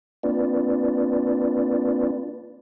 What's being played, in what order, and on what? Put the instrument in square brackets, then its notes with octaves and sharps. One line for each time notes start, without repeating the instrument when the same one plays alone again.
[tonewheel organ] A#3 C4 D4 F4 B4 D5